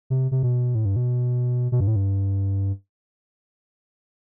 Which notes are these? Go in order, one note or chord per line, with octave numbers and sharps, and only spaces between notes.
C3
C3
B2
A2
G2
B2
B2
G2
A2
G2